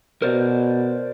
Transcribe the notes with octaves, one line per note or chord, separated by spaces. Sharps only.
B2 A#4 C5 D5